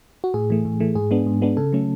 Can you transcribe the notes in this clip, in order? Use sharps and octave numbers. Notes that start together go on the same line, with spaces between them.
F#4
A2 G#4
E3 A3
A2
E3 A3
G#2 G#4
G#3 B3 D4
G#2
G#3 B3 D4
C#3 A4
F#3 A3 C#4